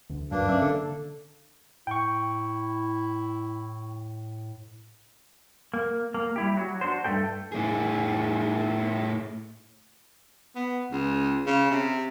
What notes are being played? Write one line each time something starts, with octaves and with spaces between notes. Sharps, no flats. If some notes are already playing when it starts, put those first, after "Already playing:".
D2
G2 F#3 A#3 D4 B4
C#4 D5 E5
D3 A4
A2 E4 G5 C#6
A#3
A#3
G3 E4 G4
F#3 F#4
D4 F#4 C5
G2 C#3 A3 A4 G5
A2 G#4
B3
C#2
C#3
C3